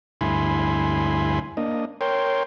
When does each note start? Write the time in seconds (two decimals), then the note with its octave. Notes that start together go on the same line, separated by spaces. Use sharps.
0.21 D2 G2 E4 G#5 B5 C6
1.57 A#3 D4 D#5
2.01 A#4 C#5 G5 C6